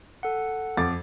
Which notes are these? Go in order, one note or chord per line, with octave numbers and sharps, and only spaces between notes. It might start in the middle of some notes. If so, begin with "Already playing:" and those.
A4 F#5
F2 D6 A6